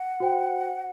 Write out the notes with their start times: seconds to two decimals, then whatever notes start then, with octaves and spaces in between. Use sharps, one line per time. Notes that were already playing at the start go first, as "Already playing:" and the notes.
Already playing: F#5
0.20 F#4 C5 G5